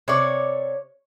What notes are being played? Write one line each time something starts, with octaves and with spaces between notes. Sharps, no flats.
C3 C#5 D5